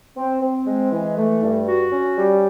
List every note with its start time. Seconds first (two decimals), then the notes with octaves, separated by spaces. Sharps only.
0.17 C4
0.42 C4
0.66 G#3
0.92 E3
1.17 A3
1.42 G2
1.67 F#4
1.91 C#4
2.17 G3